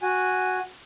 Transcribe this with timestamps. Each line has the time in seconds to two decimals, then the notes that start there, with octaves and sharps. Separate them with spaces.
0.02 F#4 G#5